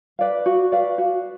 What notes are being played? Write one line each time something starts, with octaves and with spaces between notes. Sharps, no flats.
B4 D5 F5
F#4
B4 D5 F5
F#4